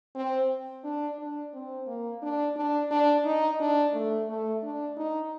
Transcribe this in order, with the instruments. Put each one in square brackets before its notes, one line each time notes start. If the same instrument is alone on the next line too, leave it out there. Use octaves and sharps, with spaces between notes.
[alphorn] C4
D4
D4
C4
A#3
D4
D4
D4
D#4
D4
A3
A3
D4
D#4